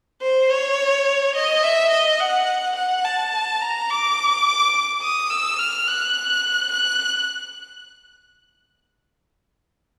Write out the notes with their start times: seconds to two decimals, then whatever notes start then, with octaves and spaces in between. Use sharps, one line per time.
0.21 C5
0.50 C#5
1.35 D#5
1.63 E5
1.91 D#5
2.20 F#5
2.76 F#5
3.04 A5
3.61 A#5
3.90 D6
5.02 D#6
5.30 E6
5.59 F6
5.87 F#6
6.72 F#6